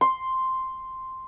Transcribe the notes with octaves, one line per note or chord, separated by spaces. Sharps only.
C6